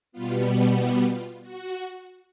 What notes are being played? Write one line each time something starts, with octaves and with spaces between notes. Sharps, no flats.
B2 G3 B3 F4
E4
F4
F#4